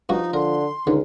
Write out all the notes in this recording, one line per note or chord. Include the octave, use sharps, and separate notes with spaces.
G2 F3 D#4 F#4
D3 A#4 C6
C#2 D3 D#3